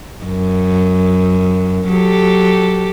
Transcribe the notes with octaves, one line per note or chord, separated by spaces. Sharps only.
F#2
F#3 G4 A4